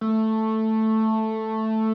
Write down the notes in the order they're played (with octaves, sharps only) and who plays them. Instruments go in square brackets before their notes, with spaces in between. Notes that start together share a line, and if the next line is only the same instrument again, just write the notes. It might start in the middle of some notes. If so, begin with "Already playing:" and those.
[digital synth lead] A3